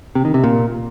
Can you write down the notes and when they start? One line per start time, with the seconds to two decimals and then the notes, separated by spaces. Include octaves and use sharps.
0.15 C3
0.25 D#3
0.34 C3
0.44 A#2